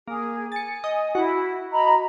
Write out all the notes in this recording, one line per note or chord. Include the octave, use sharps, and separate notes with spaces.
A#3 G#4
G#5 A6 C#7
D#5
E4 F#4
D#5 A#5 B5